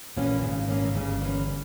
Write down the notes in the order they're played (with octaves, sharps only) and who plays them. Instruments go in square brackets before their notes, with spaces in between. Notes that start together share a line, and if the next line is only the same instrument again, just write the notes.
[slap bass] A#1 A#2 [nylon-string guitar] E3 A#3 C#4
[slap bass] G#1 G#2 [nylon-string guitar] C#3
[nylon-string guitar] E3 A#3 C#4
[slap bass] G#2
[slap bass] G1 G2 [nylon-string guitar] C#3
[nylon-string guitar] E3 A#3 C#4